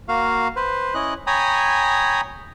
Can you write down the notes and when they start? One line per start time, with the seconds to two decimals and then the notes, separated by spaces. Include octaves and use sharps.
0.08 A#3 F#4 F5
0.56 B4 C5
0.94 C#4 E4 D#5 F#6
1.27 C#5 G5 G#5 A#5 B5 D#6